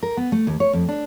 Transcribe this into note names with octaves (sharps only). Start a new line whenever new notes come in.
A#4
B3
A3
D#2
C#5
F2
D4